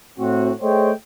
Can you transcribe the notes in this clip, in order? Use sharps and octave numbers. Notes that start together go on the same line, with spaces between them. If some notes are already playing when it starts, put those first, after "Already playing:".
A2 C4 F#4
A3 G#4 C5 C#5 D#5 G5